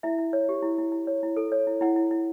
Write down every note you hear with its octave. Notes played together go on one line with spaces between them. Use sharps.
E4 E5
E4
C#5
G4
E4
E4
E4
C#5
E4
A4
C#5
E4
E4 F#5
E4
E4